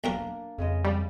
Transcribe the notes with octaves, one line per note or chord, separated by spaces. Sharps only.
B1 F#2 A#3 D4 A#4
F2 C#3 G#3 D#5
G3